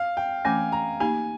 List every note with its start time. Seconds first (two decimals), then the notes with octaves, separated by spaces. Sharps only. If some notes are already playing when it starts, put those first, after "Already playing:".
Already playing: F5
0.17 G5
0.45 E3 A3 C#4 G#5
0.72 A#5
1.00 A#3 D#4 G4 G#5